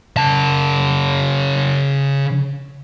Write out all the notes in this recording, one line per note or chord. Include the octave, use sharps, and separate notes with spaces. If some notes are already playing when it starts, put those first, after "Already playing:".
C#3 A5